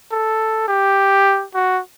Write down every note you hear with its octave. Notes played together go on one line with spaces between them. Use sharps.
A4
G4
F#4